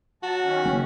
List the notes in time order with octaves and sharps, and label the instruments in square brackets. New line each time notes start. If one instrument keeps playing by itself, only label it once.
[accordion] F#3 A5 [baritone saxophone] F#4
[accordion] D#3 C#4
[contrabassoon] F#1